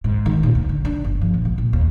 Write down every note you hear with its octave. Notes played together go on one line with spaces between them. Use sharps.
G#2
D#3
A#2
D2
D3
D4
G1
F3
A#1
C3
A#2
D#2